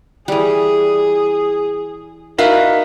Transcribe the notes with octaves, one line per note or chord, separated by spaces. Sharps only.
E3 G3 G#4
D#4 E4 F#4 A#4 B4 E5 F5